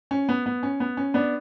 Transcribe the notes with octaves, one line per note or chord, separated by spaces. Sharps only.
C#4
B3
B3
C#4
B3
C#4
B3 D4